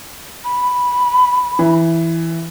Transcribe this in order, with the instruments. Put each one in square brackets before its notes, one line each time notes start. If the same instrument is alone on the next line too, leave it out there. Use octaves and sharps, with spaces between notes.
[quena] B5
[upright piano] E3